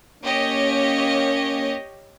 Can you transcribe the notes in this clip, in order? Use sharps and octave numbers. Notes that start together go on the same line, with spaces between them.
A#3 C#4 G4 C#5 D#5